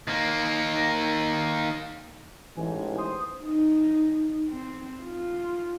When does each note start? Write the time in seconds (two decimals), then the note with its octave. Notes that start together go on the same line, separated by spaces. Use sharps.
0.08 D#3 A#3
2.56 A1 G#2 E3 G#5
2.97 C5 D#6
3.44 D#4
4.49 C4
5.03 F4